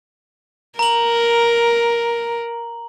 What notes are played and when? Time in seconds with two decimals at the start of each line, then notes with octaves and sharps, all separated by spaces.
0.79 A#4 A#5 F#7